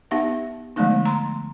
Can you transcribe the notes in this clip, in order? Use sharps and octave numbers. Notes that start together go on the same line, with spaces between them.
B3 D#4 G4 E5 F#5
D3 F3 G#3 A3 B3 D#4
A#5 C6